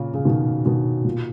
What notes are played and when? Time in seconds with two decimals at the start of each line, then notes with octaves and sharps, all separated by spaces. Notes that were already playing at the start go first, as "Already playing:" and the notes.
Already playing: A#2 C#3
0.14 C#3
0.25 B2 D#3
0.65 B2 D#3
1.04 A#2